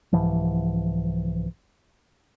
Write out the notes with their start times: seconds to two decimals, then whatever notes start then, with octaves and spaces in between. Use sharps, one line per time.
0.13 C2 G#2 E3 F3